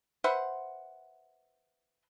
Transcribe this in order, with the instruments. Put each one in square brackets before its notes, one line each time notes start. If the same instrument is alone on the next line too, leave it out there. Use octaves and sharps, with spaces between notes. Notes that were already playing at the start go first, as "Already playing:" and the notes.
[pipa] B4 C5 E5 F#5